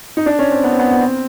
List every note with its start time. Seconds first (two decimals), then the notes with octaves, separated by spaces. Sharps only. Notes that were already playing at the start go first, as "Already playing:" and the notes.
0.17 D#4
0.26 D4
0.39 C#4
0.51 C4
0.64 B3
0.71 C4
0.79 B3
0.91 B3
1.01 C4